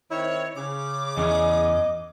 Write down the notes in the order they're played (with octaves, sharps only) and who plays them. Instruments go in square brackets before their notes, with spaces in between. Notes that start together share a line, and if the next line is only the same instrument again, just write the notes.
[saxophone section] D#3 C4 E4 [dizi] C#5
[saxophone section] C#3 [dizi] D6
[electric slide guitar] E2 [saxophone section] C#3 C#4 G#4 [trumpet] D#5